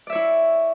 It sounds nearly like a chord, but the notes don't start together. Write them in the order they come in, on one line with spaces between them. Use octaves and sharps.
D5 E5 C#5 E4